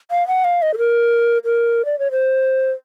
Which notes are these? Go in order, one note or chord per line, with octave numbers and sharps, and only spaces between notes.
F5
F#5
F5
D#5
A4
A#4
A#4
D5
C#5
C5